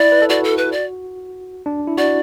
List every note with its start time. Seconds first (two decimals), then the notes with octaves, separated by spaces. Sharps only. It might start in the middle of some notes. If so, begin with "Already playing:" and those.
Already playing: E4 D5
0.12 B4
0.22 A4
0.29 F#4 D5
0.44 A4
0.57 B4
0.72 D5
1.66 D4
1.87 E4
1.98 F#4 D5